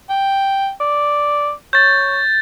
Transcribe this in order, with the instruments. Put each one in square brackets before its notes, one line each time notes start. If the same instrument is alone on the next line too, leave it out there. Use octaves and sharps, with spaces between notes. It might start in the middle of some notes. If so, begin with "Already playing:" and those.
[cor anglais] G5
D5
[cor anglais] C#5 [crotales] G6 A6